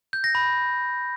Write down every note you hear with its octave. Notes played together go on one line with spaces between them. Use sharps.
G6
A#6
B5